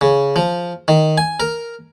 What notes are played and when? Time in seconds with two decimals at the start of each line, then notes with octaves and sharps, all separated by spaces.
0.01 C#3
0.36 F3
0.88 D#3
1.18 G#5
1.40 A#4